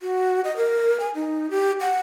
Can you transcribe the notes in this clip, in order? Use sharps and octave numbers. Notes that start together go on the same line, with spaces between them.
F#4
D#5
A#4
G#5
D#4
G4
F#5